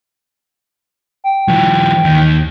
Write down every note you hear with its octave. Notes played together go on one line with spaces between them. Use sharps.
G5
E3 F#3
D#2 D#3